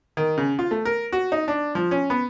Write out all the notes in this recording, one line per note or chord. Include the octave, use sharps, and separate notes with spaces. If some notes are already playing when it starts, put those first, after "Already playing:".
D#3
C#3
F4
A3
A#4
F#4
D#4
D4
F3
C#4
B3